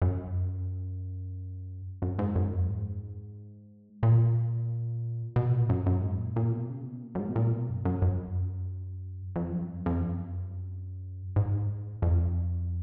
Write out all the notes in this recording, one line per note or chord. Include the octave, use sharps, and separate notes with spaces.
F#2
F#2
G#2
F#2
F2
G#2
A#2
B2
A#2
F#2
F#2
G#2
A#2
A#2
B2
C#3
B2
A#2
F#2
G#2
B2
A#2
B2
F#2
F#2
F#2
F2
F#2
F2
F2
F#2
G#2
F2